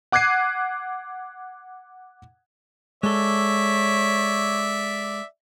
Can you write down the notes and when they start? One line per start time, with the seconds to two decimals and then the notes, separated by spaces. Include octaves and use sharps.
0.12 F#5 D6 F#6 G#6 C7 D#7
3.03 G#3 A4 C#5 D5 E5